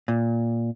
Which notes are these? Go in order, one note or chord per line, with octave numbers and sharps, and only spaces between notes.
A#2